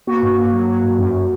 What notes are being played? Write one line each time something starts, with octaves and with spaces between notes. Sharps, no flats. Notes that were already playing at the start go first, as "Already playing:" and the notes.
A#3 F#4
G2
A#3
F#3
F#3
G2
F#2